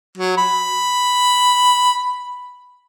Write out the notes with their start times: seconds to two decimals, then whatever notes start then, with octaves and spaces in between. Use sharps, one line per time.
0.18 F#3
0.38 B5